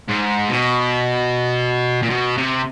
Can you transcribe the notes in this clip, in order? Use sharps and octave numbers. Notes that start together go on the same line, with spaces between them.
G#2
B2
A#2
B2
C3